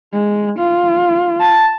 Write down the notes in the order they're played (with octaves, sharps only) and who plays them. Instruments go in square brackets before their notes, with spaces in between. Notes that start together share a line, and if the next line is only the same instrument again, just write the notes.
[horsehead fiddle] G#3
F4
[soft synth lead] A5